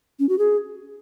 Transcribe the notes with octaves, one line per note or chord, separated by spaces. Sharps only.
C#4
F#4
G#4